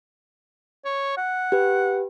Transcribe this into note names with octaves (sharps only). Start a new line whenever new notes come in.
C#5
F#5
G4 B4